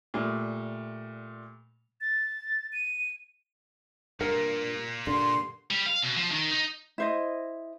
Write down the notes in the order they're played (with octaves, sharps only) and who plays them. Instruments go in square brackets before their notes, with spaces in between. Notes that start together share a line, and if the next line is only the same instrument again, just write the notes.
[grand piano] A#2 G3 A3
[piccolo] A6
D#7
[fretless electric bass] G2 [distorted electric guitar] A#2 A#3 [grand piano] A#4
[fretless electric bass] G2 D3 [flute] C6
[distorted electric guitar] G3
F5
B2
F3
D#3
D#4
[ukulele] E4 C5 D#5